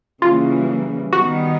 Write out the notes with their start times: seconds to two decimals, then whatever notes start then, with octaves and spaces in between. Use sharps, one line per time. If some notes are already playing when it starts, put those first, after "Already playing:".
0.22 C#3 E3 G3 A#3 F4
1.13 D#3 G3 B3 D#4 F#4